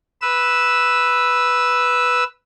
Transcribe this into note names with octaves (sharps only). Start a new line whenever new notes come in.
B4 E6